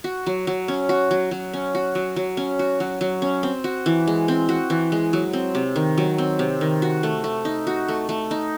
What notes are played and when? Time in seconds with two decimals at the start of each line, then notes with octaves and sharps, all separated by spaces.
0.04 F#4
0.26 F#3
0.47 F#3
0.68 C#4
0.89 F#4
1.11 F#3
1.31 F#3
1.53 C#4
1.75 F#4
1.95 F#3
2.16 F#3
2.37 C#4
2.59 F#4
2.80 F#3
3.01 F#3
3.22 C#4
3.43 C4
3.64 F#4
3.86 E3
4.07 G#3
4.28 C4
4.49 F#4
4.70 E3
4.92 G#3
5.13 F#3
5.33 C4
5.55 C3
5.76 D#3
5.98 F#3
6.18 C4
6.39 C3
6.61 D#3
6.82 F#4
7.03 A3
7.24 A3
7.45 D#4
7.67 F#4
7.88 A3
8.09 A3
8.31 D#4